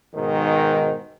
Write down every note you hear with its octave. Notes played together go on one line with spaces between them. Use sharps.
G#2 B2 D#3